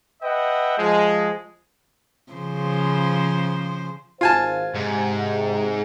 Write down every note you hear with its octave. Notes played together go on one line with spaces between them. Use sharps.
B4 D#5 E5 F#5 G5
F3 G#3
C#3 F3 C5
G#1 F4 C5 F5 G#5 A5
G#2 C3